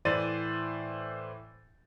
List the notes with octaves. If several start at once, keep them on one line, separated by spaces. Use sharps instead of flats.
A2 E3 C5 D5 A6 D#7